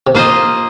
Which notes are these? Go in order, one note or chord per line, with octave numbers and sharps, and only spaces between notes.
C3
A#2 A#3 F4 C5 D#5